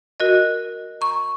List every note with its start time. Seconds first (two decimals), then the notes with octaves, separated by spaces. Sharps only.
0.20 F#4 A#4 D#5
1.01 A#5 C#6